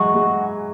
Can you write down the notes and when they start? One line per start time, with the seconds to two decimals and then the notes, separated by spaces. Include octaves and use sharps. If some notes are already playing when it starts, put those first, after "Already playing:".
Already playing: E3 F#3 G#3 F#4
0.15 G#3